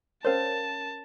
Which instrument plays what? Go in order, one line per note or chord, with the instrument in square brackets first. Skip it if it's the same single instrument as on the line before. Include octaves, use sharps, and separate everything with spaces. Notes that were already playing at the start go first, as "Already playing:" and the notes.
[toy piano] C#4 A#4 C#5 [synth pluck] C5 F5 [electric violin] A5